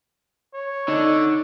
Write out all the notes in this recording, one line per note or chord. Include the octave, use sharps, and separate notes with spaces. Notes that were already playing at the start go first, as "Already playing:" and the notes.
C#5
D3 D#4